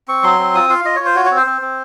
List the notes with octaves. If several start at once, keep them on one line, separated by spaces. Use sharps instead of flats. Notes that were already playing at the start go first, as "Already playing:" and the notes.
C4 C#6
F#3 C6
C4
F4 D#6
F4 F5
F4 D#5
F4 C#5
C5
F#4 C#5
C#5
C4
C5
C4
C4